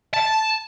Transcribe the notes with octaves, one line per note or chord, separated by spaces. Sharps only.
A5